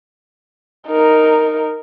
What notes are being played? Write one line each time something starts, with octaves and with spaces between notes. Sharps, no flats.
D#4 A#4